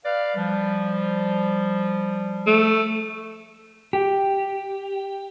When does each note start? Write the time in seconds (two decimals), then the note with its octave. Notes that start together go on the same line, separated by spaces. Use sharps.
0.04 B4 D5 F5
0.35 F3 G3
2.47 A3
3.93 G4